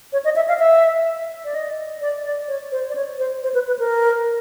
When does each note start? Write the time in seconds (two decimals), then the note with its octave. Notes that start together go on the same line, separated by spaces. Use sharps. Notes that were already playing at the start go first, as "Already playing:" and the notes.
0.13 C#5
0.25 D#5
0.36 E5
0.48 F5
0.59 E5
1.45 D5
1.54 D#5
2.01 D5
2.24 D5
2.48 C#5
2.72 C5
2.90 D5
2.95 C#5
3.19 C5
3.43 C5
3.54 B4
3.67 B4
3.79 A#4